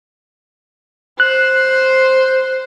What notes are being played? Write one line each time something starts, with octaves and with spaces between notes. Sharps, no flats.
C5 F#6